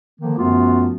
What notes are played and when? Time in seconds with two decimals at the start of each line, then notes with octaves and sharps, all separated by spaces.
0.20 D3 D#3 F3 A#3
0.38 F#2 F3 A3 B3 F4 F#4